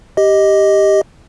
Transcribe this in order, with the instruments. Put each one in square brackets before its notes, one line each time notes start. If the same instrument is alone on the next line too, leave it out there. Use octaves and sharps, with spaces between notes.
[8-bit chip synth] G4 D#5